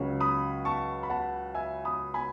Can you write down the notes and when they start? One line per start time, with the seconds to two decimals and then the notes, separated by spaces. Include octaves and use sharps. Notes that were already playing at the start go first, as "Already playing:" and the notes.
Already playing: C#2 C#3 F#3 C#4
0.21 B5 D#6
0.65 A5 C#6
1.03 B5
1.10 F#5 A5
1.55 E5 G#5
1.85 B5 D#6
2.14 G#5 B5